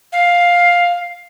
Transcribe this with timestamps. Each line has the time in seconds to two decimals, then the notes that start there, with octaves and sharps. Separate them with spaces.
0.12 F5